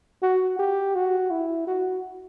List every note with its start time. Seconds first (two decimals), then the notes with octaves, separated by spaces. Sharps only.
0.23 F#4
0.59 G4
0.95 F#4
1.31 E4
1.67 F#4